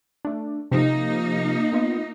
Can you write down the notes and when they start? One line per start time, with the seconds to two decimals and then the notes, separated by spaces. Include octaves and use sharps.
0.25 A3 D4
0.71 C3 F3 A#3 D#4
1.73 B3 F4 D#5